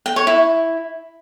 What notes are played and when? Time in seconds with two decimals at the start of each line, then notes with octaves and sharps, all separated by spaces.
0.06 G5
0.16 C#5
0.27 E4